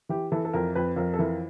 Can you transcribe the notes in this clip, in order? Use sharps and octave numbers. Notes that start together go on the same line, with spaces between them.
E3 G4
E3 A4
A4
F2 A#4
F2 B4
F2 A#4
A4
E3 A#4